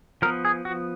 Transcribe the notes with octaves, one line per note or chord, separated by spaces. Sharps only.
F3 B3 A#4
G#4
F#4